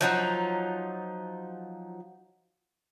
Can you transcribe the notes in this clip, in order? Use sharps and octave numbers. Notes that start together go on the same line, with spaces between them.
F3 F#3 D#4